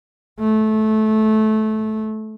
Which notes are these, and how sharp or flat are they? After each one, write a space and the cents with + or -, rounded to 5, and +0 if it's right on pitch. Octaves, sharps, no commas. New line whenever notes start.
A3 -20